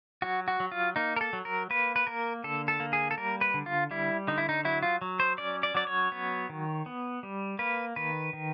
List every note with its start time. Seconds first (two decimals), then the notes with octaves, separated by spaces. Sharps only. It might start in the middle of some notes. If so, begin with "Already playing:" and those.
0.22 F#3 F#4
0.48 F#4
0.60 F#3
0.72 F4
0.96 A#3 D#4
1.16 A#4
1.21 A4
1.33 F#3
1.45 A#4
1.70 A#3 B4
1.96 B4
2.07 A#3 A#4
2.44 D3 A4
2.68 A4
2.80 A#3
2.93 G#4
3.11 A4
3.18 G3 A#4
3.41 B4
3.54 D3
3.66 F4
3.91 G3 E4
4.28 D3 D#4
4.38 E4
4.49 D#4
4.65 F#3 E4
4.83 F4
5.01 F#3
5.20 C5
5.38 C#4 D5
5.63 D5
5.75 F#3 D5
5.87 C#5
6.12 B3
6.49 D#3
6.86 B3
7.23 G3
7.59 A#3 B4
7.96 D#3 B4
8.33 D#3